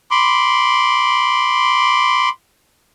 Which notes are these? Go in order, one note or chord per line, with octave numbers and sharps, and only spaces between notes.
B5 C6 D6